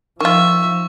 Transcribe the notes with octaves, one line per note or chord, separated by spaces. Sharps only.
D#3 F3 F4 E5 C#6